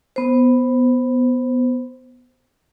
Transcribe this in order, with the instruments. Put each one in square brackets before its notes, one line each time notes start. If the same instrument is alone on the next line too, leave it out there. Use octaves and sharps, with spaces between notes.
[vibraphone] B3 C5